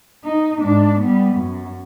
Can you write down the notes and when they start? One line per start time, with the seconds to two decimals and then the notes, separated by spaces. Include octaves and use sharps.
0.24 D#4
0.61 G#2 D4
1.00 G3 B3
1.34 F#2